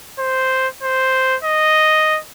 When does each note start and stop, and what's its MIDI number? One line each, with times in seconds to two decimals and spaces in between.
0.19 0.68 72
0.83 1.37 72
1.43 2.19 75